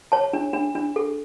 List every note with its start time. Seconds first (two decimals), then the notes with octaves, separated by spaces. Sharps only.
0.12 C#5 A5
0.33 D4
0.53 D4
0.75 D4
0.96 A4